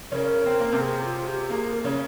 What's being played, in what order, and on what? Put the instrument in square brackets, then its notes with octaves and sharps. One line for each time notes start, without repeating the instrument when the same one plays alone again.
[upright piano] C#3 C#4 [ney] A#4
[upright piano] C4
A#3
C3 C4
[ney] G#4
F4
G4
[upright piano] A#3 [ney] G#4
[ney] A#4
G#4
[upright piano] C#3 C#4 [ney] A#4